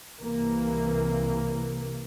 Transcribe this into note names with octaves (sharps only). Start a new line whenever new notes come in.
C2 C3 E3 A#3